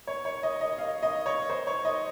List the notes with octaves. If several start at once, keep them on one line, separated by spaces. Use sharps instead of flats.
C#5
C#5
D#5
D#5
F5
D#5
C#5
C5
C#5
D#5